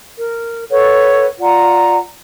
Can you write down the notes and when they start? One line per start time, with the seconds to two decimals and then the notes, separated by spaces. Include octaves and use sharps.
0.18 A#4
0.70 A4 B4 C#5 F#5
1.41 F4 D5 F#5 A#5